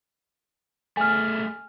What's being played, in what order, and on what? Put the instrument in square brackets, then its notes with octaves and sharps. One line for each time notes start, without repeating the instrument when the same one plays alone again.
[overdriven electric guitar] A3 G#4 [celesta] G#5 F6